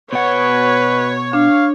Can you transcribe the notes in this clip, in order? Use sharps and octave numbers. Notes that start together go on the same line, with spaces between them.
B2 B4 C#5 F#5
D4 F5